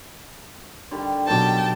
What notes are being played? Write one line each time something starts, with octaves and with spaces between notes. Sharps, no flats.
D3 D#3 G3
B2 D#3 F#3 G4 G5 A5